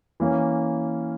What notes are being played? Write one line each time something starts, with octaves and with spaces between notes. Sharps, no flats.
E3 A#3 C#4